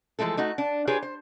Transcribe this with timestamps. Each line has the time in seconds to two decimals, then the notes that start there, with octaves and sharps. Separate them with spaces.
0.19 E3 F3 G#3 A3 A4
0.37 A3 D#4 F#4
0.58 D4
0.87 F4 G4 G#4 B4 C#5
1.02 C5